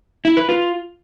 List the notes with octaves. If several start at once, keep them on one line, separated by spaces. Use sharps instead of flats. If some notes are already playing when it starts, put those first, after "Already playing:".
E4
B4
F4